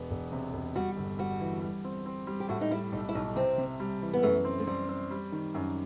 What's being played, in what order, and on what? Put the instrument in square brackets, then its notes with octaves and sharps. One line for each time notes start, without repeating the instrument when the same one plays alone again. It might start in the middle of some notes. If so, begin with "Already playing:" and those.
Already playing: [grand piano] E1 B3
E1
C3
E1
[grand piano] G3 [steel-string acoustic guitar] F#4
[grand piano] G1
[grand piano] G3 [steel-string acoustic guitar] F#4
[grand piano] E3
G3
C4
C4
G3
[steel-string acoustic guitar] G4
[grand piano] A2 [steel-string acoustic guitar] F#4
[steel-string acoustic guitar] D#4
[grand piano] G3 [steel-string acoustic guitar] E4
[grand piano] B1 [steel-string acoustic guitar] D#4
[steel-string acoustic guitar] E4
[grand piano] B1 [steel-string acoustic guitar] D#4
[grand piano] C3 [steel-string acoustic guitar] C4
[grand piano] C3
G3
E3
[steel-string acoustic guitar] B3
[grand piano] F#2 [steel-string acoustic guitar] A3
[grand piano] C4
[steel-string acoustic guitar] A3
[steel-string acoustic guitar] G3 [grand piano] C4
[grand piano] C4
G3
D#3
F#2